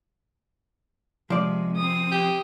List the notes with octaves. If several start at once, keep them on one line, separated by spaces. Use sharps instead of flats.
C3 F3 G#3 D5
C4 D#6
G4